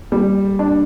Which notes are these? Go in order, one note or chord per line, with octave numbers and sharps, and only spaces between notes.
G3
D4